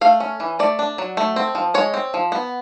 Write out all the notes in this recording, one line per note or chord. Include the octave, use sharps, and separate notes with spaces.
A3 F5
C#4
E3
A3 D5
D4
F#3
A3
C4
F3
G#3 C#5
C4
F3
B3